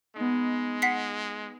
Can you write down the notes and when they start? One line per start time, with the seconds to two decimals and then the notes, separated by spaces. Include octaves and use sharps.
0.16 G#3 B3 D#4
0.82 F#5 B6 C7